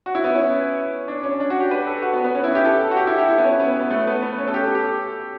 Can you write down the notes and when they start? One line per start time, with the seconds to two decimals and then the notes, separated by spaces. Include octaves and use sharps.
0.06 F#4
0.15 E4
0.24 B3
0.35 C#4
1.08 D4
1.23 C#4
1.40 D4
1.50 F#4
1.60 G4
1.71 B4
1.87 A4
2.02 F#4
2.13 B3
2.24 B3
2.34 C#4
2.44 E4
2.55 G4
2.65 A4
2.91 F#4
2.97 G4
3.07 E4
3.18 G4
3.28 E4
3.38 B3
3.44 C#4
3.60 B3
3.80 B3
3.90 A3
4.07 B3
4.22 B3
4.38 C#4
4.48 A4
4.54 G4
4.64 A4
4.75 G4